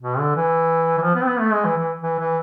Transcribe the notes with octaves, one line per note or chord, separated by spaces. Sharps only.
B2
D3
E3
E3
F3
B3
C4
B3
A3
G#3
E3
E3
E3
E3